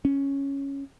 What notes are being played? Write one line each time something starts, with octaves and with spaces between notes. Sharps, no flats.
C#4